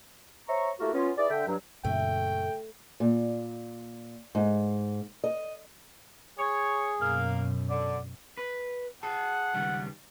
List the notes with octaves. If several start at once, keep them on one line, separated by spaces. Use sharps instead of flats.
C5 C#5 E5 A#5 C#6
A3 A#3 E4 F#4 G4 A#4
B3 C#4 F4
E4 G#4 B4 D5
D3 E5 G5
G2 F#3
F#2 A#2 C#3 A3 G5
A#2
G#2
D#5
G#4 C#5
F#2 B2 A#3 F5
D3 D5
B4
G#4 F#5 A5
C#2 D#3 G3